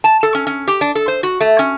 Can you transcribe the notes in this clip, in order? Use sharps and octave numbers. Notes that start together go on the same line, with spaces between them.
A5
A4
C#4
C#4
G4
D4
A4
C5
F#4
A3
C#4